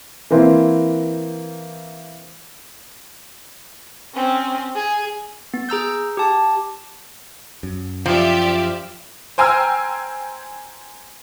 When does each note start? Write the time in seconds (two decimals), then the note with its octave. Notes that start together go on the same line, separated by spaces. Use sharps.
0.30 E3 A#3 C4 E4
4.14 C4 C#4
4.75 G#4
5.54 B3
5.69 G#4 A#5 E6 G6
6.17 G4 A5
7.63 F#2
8.06 F3 G4 D5 E5
9.38 C5 G5 G#5 A#5 E6 F6